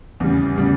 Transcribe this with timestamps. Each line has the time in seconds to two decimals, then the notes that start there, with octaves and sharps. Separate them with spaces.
0.20 E2 C#3 G3
0.56 C#3 G3